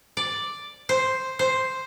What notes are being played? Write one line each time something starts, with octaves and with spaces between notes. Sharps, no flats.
D5
C5
C5